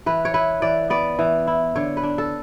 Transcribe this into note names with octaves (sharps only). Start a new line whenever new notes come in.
E3 B4
C#5
E4 B4
E3 D5
B3 D5
E3
E4
D3 C#5
B4
D4
A4